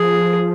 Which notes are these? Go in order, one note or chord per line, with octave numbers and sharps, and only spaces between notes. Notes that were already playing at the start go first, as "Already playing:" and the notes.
Already playing: F3 G#4